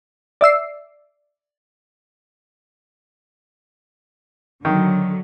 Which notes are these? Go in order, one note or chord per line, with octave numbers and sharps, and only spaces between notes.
D5 E5 E6 C7
D3 D#3 F#3